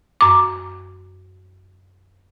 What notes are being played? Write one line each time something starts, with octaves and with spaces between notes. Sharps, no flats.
F#2 D6